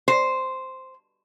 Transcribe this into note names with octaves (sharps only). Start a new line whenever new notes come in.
C5